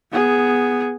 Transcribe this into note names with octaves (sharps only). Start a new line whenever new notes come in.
B3 G#4